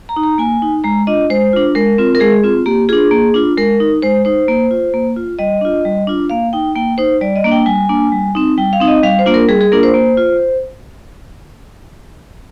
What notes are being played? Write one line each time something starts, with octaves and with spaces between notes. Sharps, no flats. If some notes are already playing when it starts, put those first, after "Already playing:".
A#5
D#4
A#5
A#3 G#5
D#4
G#3 A#5
D4 F4 D#5
G#3 C5
D4 F4
G#3 A#4
C4 F4
A#4
G#3 G#4
C4 F4
A#3 G4
D4 F4 G#4
A#3
D4 F4
G#3 A#4
D#4
G#3 C5
D#4 C5
A#3
F4
A#3
F4
G3 D#5
D4 F4
G3
D4 F4
A#3 F5
D#4 G5
A#3 G5
D#4 C5
G3 D5
D#5
A#3 D4
G5
G3 G#5
A#3 D4
G3
C4 D#4
G3 G5
F5
C4 D#4
D#5
G3 F5
C5
A#3 D4 F4
A#4
G3 G#4
G#4
A#3 D4 F4 A#4
C5
A#3
F4